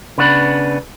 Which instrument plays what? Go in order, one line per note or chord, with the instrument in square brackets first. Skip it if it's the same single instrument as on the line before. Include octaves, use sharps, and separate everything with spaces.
[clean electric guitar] C#3 B3 D4 B4